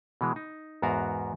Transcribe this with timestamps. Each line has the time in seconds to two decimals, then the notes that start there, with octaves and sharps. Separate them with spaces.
0.21 B2 E3 G#3
0.36 D#4
0.82 E2 G#2 B3 F#4 A#4 F5